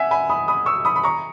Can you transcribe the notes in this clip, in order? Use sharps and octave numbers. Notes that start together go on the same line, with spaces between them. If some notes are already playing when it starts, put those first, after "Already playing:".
Already playing: E5 F#5 G#5
G#5 B5
B5 D#6
B5 D#6
C#6 E6
B5 D#6
B5
A#5 C#6